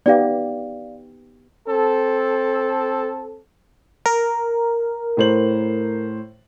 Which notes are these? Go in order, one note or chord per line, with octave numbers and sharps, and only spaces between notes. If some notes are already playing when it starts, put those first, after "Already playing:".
B3 D#4 G4 D5 F5
C4 A4
A#4
A2 C5 F#7